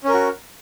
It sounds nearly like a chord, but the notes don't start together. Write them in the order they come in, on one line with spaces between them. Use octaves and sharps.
C#4 A#4 F#4